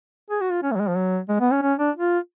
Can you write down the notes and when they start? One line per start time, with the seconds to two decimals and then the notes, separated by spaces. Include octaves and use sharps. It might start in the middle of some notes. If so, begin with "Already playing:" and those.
0.30 G#4
0.41 F#4
0.51 F4
0.62 C#4
0.71 A3
0.76 F#3
0.80 G#3
0.88 F3
0.96 F#3
1.29 G#3
1.40 B3
1.51 C#4
1.62 C#4
1.79 D4
1.96 F4